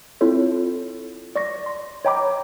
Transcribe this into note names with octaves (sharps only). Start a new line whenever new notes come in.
C4 E4 F4 A4 C#5
D5 C#6 A#6
C6
C#5 D#5 G5 A#5 B5 D6